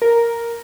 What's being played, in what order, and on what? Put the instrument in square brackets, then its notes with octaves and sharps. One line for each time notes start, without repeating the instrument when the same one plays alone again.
[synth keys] A#4